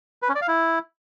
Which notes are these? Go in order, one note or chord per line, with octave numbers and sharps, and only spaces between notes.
B4
C#4
D5
F5
E4